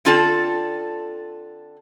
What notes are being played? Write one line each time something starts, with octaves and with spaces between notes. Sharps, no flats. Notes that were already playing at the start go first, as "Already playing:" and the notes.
D3 C4 F4 A4 D5 A5